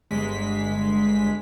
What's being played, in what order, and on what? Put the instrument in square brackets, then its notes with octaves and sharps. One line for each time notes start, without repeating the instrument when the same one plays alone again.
[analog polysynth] G1 G#3 B6